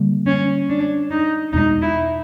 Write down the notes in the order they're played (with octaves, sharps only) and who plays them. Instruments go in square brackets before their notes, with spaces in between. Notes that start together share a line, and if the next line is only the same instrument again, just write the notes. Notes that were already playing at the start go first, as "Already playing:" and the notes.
Already playing: [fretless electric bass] D3 G3 A#3
[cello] C#4
D4
D#4
[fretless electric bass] E2 B2 G#3 [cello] D#4
[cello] E4